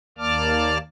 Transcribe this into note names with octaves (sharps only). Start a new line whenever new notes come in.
D#2 A#3 D5 A5 D6 F6